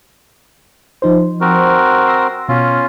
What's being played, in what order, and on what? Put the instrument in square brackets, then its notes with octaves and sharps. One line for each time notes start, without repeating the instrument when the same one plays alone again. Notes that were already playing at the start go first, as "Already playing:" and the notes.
[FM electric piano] F3 D#4 C5
[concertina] C4 F#4 A#4
[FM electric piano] C6 E6 A#6
[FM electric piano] B2 [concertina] C#4 F4